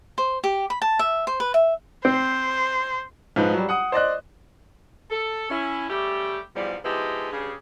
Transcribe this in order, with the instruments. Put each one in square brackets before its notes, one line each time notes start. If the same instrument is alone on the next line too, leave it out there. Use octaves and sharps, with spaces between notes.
[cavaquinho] C5
G4
B5
A5
E5
C5
B4
E5
[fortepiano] C4 [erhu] C5
[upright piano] G#2 F3 D#4 B4
F#3 G3
F#5 D#6
C5 D5 D#5 F#6
[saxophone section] A4
C#4 E4
C#3 G3 A3 G4
E2 G#2 F3 G3
F3 G#3 B3 D#4 E4 G4
G2 C#3 G4 G#4